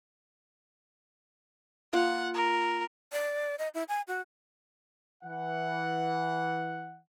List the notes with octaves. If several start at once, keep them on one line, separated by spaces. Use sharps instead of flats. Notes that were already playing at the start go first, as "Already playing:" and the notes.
A#3 F4 F#5
A#4
D5
D#5
E4
G#5
F#4
E3 F#5